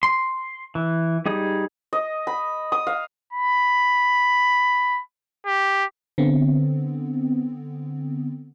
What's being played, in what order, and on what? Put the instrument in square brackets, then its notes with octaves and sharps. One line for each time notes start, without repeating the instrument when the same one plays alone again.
[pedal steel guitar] C6
E3
G3 D#4 G#4
[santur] D#5
B5
D#6
F5
[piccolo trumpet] B5
G4
[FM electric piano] D3 B3 C4